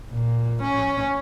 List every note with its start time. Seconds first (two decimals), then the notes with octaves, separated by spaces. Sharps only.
0.12 A#2
0.63 C#4